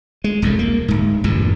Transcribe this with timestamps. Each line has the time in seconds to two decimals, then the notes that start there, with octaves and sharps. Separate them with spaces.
0.24 G#3
0.42 E1 C2 F#2 A3
0.59 A#3
0.88 D1 G#2
1.24 G1 E2 G2 A#2